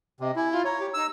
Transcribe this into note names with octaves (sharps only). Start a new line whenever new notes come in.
C3 D#5
E4 G#5
F4
C#5 A#5
G4
D#4 E6